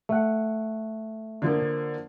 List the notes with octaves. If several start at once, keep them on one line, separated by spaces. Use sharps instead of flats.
A3 F#5
D3 F3 A#3